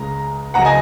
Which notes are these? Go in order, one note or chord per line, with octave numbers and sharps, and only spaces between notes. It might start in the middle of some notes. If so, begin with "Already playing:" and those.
Already playing: C#2 C#3 G#3 A#5
C#2 C#3 F#3 F#5 A#5
D#5 G#5